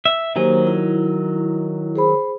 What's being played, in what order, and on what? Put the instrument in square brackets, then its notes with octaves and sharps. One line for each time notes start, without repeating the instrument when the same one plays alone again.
[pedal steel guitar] E5
[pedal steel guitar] D#3 F#3 G#5 [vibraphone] A#3 G4 C5
[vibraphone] E4
G#4 C5 B5